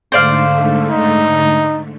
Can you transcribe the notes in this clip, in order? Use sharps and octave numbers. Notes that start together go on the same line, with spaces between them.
G#2 D3 A3 C5 D5 F5
D#4